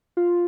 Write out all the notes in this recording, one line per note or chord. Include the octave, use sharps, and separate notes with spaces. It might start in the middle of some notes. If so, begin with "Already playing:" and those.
F4